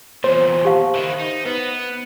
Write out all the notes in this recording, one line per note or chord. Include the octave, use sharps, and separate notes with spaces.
E2 A#2 C5 C#5
G4 F5 A5
D#3 E4
D#4
B3 B4